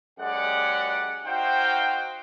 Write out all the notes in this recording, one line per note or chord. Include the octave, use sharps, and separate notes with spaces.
F#2 G#3 G4 D5 F#5
D#4 F#4 C5 F5 G5